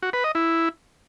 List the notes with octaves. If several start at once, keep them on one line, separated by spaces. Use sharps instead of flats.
F#4
B4
D#5
E4